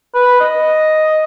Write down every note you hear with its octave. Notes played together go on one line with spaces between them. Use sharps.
B4
D#5